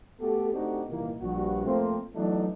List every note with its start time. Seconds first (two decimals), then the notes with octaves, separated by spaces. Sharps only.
0.20 A3 B3 F#4 G4 A4
0.52 A3 C4 D4 D#4 F#4 G4
0.89 C2 A#2 D#3 E3 A#3
1.20 A#1 G2 F#4
1.65 F2 A3 A#3 C4
2.15 E3 F#3 A3 B3 D4 D#4